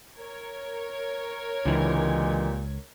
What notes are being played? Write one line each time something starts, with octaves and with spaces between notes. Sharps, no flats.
A#4 C#5 G#6
C#2 A#2 D3 E3 G#3 G4